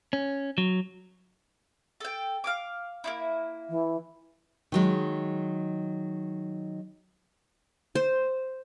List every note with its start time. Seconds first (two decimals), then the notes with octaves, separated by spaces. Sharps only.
0.13 C#4
0.58 F#3
2.00 A4 G5
2.44 F5 G#5 D6
3.04 A#3 D#4 E4
3.69 E3
4.72 D#3 F#3 G#3
7.95 C5